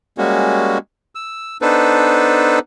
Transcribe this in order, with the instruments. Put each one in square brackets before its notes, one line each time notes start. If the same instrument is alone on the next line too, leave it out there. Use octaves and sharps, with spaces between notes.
[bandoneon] G3 G#3 A#3 C#4 F#4
E6
B3 D4 D#4 A4 B4 C5